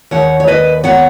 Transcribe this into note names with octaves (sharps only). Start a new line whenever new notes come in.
D#2 C#5 F#5
C#5
D#2 B4 D#5
B3 C#5 F#5